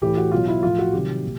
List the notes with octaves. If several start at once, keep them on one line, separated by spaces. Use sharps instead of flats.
A2 E3 G4
F#4
B2 F#3 F4
E4
A2 F3 F4
F#4
C3 D#3 F#3 G4
A#2